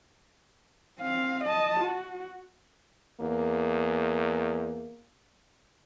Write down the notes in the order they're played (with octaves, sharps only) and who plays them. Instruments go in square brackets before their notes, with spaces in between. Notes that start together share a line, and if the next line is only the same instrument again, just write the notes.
[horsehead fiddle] C4 F5
D#5 A5
F#4
[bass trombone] E2 [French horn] A#3